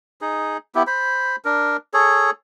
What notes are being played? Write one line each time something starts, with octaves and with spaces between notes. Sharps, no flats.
D#4 G#4
B3 E4 G4
C5 B5
D4 A#4
G#4 A4 C#5